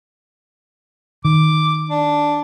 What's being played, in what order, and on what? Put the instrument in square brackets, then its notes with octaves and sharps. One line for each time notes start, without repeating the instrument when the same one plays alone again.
[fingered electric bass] D#3 [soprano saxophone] D6
[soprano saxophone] D4